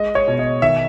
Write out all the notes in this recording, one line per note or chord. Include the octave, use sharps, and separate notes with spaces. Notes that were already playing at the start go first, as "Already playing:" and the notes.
Already playing: G#3 D#5
C#5
B2
D#5
D#3 E5